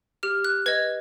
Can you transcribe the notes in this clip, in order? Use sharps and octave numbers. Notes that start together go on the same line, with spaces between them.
G4 F6
F#6
B4 D#5 G#6